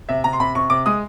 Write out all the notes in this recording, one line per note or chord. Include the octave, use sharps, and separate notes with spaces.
C3 E5
C3 A#5
C6
C3 B5
C3 C#6
C3 D6
G#3 D#6